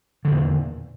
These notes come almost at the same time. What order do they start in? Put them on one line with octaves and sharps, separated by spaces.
D3 D#3 E2 A#2